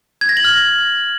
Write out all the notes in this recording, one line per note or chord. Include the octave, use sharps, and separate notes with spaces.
G#6
A#6
F#7
F6